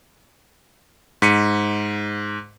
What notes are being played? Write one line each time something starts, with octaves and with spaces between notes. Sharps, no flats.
G#2 B6 C#7 D#7